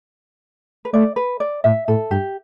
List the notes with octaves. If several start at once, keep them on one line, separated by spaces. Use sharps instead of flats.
B4
A3 D5
B4
D5
A2 E5
A2 A4
G2 G4